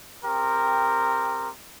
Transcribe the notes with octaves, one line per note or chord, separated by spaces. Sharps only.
C4 G4 A#4